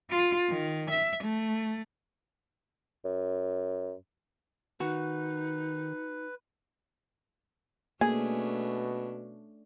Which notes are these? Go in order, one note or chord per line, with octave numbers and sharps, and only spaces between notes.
F4
D#3
E5
A3
F#2
D#3 D#4 F#4 B4
B2 A3 A#3 C#4 D4 G#4